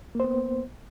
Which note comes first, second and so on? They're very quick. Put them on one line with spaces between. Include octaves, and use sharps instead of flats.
A#3 C5 B3